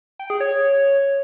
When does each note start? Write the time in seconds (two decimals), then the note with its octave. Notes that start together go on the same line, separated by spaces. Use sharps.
0.19 G5
0.30 G#4
0.40 C#5